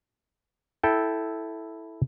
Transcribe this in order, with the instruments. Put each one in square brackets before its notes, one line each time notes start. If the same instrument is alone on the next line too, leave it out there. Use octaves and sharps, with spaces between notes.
[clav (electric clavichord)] E4 A4 G5